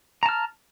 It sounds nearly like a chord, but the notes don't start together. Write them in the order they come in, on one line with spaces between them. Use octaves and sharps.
A#5 A5 F6